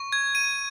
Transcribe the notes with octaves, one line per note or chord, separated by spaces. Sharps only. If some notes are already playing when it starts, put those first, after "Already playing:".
Already playing: C#6
G#6
D#7